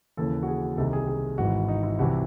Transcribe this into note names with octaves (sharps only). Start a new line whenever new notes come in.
D#2 C#3 E3 A4
F#4
G#4
F#4
C2 C3 D#3 A4
G#4
G#4
G#1 G#2 E3 F#4
D#4
E4
C2 C3 E3 F#4